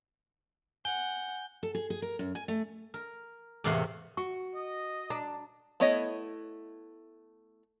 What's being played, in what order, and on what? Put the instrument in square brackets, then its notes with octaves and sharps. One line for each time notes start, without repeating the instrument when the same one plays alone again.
[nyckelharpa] F#5 [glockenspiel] G#5 G6 G7
[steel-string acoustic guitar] A4
G#4
G#4
A#4
F#2
G#5
A3
[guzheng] A#4
E2 A2 C3 A#3 F#5 C6
[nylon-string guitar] F#4 [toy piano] C#6
[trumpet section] D#5
[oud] D4 [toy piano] A#5
[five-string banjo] A3 B3 E4 C#5 D#5